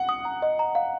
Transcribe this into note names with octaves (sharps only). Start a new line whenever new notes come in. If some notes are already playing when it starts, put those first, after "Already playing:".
Already playing: F#5
D#6
A#5
D#5
A#5
F5